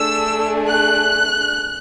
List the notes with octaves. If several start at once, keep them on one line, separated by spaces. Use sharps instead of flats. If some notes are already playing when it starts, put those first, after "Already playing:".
Already playing: A3 D4 G#4 E6
F#6